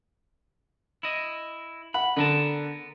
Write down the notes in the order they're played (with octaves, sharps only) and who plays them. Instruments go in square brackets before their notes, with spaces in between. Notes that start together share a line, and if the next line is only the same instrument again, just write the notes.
[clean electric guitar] E4 D#5
[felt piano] F#5 [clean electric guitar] B5
[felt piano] D3 [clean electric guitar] B3 A#4 A5